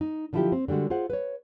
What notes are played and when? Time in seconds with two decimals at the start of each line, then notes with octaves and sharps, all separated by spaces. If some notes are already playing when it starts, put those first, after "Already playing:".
0.01 D#4
0.33 D3 F3 F#3 E4 F4 G4
0.52 C4
0.68 D3 G3 G#3 F#4
0.90 F4 G#4 C5 F#5
1.10 B4 C#5